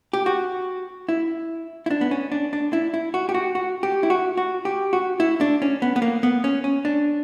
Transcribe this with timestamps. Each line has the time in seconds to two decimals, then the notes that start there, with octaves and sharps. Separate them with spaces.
0.13 G4
0.26 F#4
1.09 E4
1.86 E4
1.91 D4
2.01 B3
2.11 C#4
2.32 D4
2.53 D4
2.73 E4
2.94 E4
3.14 F#4
3.29 G4
3.34 F#4
3.55 F#4
3.83 G4
4.03 E4
4.10 F#4
4.37 F#4
4.65 G4
4.93 F#4
5.20 E4
5.41 D4
5.62 C#4
5.82 B3
5.96 B3
6.02 A#3
6.23 B3
6.44 C#4
6.64 C#4
6.85 D4